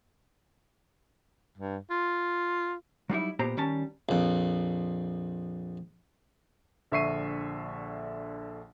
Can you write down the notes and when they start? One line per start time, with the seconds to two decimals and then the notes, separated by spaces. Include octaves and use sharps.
1.58 G2
1.91 F4
3.10 F#3 G3 D#4 E4
3.39 A#2 B3 G4 C5 A#5
3.57 D#3 G3 C#4 A5
4.09 A#1 F2
6.91 A#1 D3 E5 C#6 C7 D#7